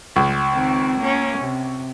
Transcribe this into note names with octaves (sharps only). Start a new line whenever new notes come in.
C#2
D#3 C4
A#3 C#4
C3